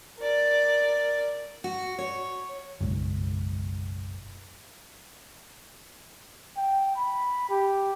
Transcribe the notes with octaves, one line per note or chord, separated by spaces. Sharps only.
A#4 D5
F#4
C#5
F#1 B1 G#2
G5
B5
G4